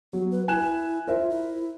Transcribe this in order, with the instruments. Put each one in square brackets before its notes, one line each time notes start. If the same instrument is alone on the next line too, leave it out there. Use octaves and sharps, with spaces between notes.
[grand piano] F#3 [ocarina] B3
[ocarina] B4
[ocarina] E4 [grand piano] G#5 F#6 E7
[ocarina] F4 [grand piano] A#4 C5 E5
[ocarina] E4